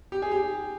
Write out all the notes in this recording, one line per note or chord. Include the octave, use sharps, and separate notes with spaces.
G4
G#4
G4